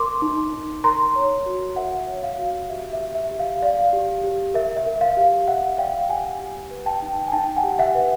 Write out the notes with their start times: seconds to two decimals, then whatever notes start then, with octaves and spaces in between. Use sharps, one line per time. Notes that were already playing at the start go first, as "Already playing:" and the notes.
Already playing: A#4 C6 D6
0.22 D#4
0.53 D#4
0.84 A#4 A#5 C6
1.16 C#5
1.46 F#4
1.76 A#4 E5 F#5
2.07 C#5
2.23 F5
2.38 F#4
2.70 G4 E5
2.93 E5
3.00 G4
3.15 E5
3.31 G4
3.39 F5
3.62 D5 F5
3.93 G4
4.24 G4
4.54 A#4 E5
4.77 E5
4.86 A#4
5.01 F5
5.17 G4
5.48 G4 E5 F#5
5.78 D5 F5 G5
6.09 G4 F#5 G#5
6.40 G4
6.71 B4
6.86 G5 A5
7.02 D#4
7.28 G#5
7.32 D#4 G5 A5
7.57 F#5 G#5
7.64 G4
7.79 E5 F#5
7.95 B4